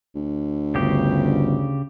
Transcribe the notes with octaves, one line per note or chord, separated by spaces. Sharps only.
D2
G1 C#3 G4